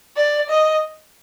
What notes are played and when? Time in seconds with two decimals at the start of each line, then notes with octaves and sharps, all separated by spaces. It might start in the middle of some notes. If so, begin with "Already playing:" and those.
0.17 D5
0.49 D#5